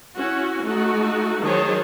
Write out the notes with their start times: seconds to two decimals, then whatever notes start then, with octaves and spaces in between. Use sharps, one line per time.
0.16 C#4 E4 F#4
0.65 A3 D#4 F#4
1.43 D#3 F#3 G#4 C5 C#5 A5